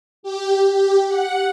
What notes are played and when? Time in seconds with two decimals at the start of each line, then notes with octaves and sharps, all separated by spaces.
0.23 G4
0.72 G4
1.08 F#5